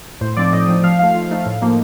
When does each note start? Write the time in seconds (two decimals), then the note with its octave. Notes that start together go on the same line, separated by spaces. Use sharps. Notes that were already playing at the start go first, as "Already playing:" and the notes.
0.21 A2 C5
0.37 F3 C4 D#4 D5
0.53 A2 D#5
0.68 F3 C4 D#4
0.84 F3 F5
0.99 A3 D#4 F5
1.15 F3
1.31 A3 D#4
1.46 A2
1.62 F3 A#3 D#4